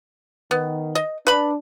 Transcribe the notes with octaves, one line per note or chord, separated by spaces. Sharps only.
D#3 B3
D#5
D4 B4 B5